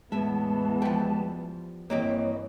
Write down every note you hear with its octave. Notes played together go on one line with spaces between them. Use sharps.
E2 A2 E3 G#3 B3 E5 A5
F3 G3
G2 E3 A#3 C4 G4 C#5 D#5